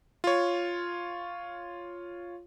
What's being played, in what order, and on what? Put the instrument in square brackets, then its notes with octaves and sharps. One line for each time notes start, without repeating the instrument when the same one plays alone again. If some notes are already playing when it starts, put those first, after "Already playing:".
[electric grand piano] F4 C#5